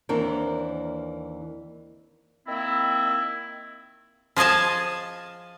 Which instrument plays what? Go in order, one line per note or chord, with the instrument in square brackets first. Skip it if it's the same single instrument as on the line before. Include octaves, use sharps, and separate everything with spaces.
[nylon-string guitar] D#2 E3 C4 D4 A#4
[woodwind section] D#3 A#3 C4 E4
[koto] F3 G#4 D#5 G#5 A5